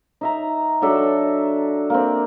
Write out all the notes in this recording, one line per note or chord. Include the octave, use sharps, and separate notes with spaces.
D#4 E5 A#5
F#3 D4 A4 E5
A#3 C4